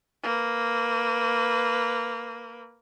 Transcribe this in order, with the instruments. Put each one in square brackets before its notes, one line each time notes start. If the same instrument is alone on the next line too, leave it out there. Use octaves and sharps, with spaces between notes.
[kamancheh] A#3 B4